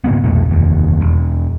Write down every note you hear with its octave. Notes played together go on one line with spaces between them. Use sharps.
G#2 C#3 A#3 B3
C2 F2 B2 A3
F1 D#2
E1